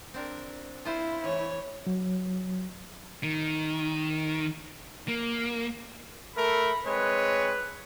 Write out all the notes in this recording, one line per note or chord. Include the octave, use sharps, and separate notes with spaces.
C4 D4 A#4
E4 F4 C5
E3 A3 C#5
F#3
D#3
A#3
A3 A4 A#4 B5
G#3 C4 B4 C#5